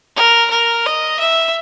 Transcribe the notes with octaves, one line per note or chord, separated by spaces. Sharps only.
A#4
A#4
D#5
E5